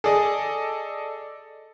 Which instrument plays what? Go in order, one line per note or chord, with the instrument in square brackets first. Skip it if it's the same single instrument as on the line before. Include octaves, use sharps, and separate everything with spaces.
[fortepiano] G#4 [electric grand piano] A4 D5 D#5